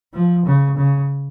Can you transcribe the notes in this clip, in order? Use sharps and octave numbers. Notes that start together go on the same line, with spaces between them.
F3
C#3
C#3